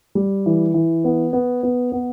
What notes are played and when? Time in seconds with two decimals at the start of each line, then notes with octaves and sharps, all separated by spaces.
0.15 G3
0.46 E3
0.74 E3
1.04 B3
1.33 B3
1.63 B3
1.92 B3